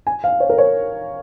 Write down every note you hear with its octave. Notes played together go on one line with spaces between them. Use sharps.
G#5
F5
C#5
A#4
C#5